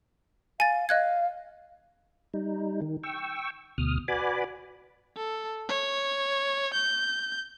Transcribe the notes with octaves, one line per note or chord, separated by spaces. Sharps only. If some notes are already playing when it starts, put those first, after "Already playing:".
F5 G#5 A6
D#5 F5 F#6 G#6
G3 D#4
D#3
G5 C#6 E6
D2 B2 D#6 F6
F#4 B4 D5 G#5 B5 D6
A4
C#5
G6